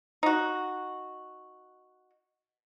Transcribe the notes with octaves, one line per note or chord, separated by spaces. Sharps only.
D#4 F#4